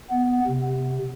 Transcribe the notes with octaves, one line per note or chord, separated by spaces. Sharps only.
B3
C3